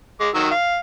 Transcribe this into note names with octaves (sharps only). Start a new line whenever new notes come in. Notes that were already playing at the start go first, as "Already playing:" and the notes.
G#3 D6
D#3 F#3 E6
F5